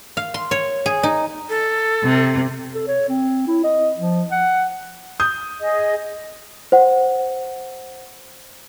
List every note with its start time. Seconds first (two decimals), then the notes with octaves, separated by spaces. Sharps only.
0.17 F5
0.34 C6
0.51 C#5
0.86 G#4
1.03 D#4
1.49 A4
2.03 C3
2.75 A4
2.87 C#5
3.09 C4
3.48 E4
3.64 D#5
3.98 F3
4.31 F#5
5.20 D#6 G6
5.60 G#4 D#5
6.72 C5 F#5